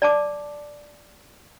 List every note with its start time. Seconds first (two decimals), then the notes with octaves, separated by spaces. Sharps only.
0.02 D5 A5 D6